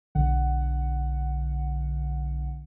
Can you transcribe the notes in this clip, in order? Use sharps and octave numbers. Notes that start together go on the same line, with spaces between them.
B1 D3 F#5